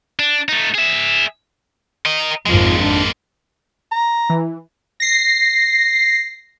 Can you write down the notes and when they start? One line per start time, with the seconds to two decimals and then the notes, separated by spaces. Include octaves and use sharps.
0.19 D4
0.49 A3 D#4
0.74 G#4 E5
2.06 A#4 D#5
2.46 G#1 F2 G#2 F3 G#3 A#3
2.80 D4
3.91 A#5
4.30 E3
5.00 A#6 C7